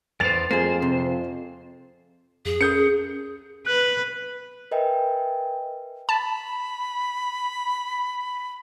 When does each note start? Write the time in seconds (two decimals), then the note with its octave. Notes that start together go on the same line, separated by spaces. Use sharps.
0.20 E2 C5 A6 F7
0.51 F2 A#3 G#4 C5
0.82 C3
2.45 F2 G#4
2.61 C#4 A4 A#4 D#6 G6 C#7
3.66 B4 F#6
4.71 A#4 B4 D#5 E5 G5 G#5
6.09 A5 B5